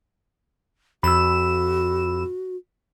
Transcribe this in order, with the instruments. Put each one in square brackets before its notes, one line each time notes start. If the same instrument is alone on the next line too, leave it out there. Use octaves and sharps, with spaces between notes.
[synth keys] F2 E7 [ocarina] F#4 [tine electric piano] B5 E6